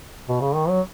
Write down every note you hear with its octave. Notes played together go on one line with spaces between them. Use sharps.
B2
C#3
D#3
F#3